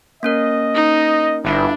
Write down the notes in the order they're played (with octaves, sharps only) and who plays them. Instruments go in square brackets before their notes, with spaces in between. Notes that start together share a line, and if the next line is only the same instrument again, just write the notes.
[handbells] A#3 C#4 A#4 [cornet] D#5
[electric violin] D#4
[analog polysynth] G1 G2 [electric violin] D4 [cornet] E4